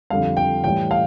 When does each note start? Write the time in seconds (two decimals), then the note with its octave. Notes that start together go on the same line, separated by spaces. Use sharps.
0.10 F2 D3 G3 F5
0.37 G5
0.64 A2 E3 G3 G5
0.91 F5